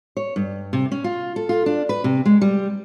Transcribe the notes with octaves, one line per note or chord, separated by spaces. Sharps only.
C#5
G2
C3
C#4
F4
A4
F4
D4
B4
C3
G#3
G3